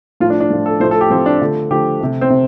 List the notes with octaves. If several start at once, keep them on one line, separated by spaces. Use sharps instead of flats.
A2 F3 A3 F4
D4
D4
A2 F3 A3
A4
A2 F3 A3 C5
A4
G4
A2 F3 A3 C4
D4
D3 F3 A3
D3 F3 A3 G4
C3 A3
C4
C3